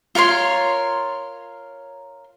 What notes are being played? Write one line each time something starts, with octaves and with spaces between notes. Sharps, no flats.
F4 A#4 C#5 C6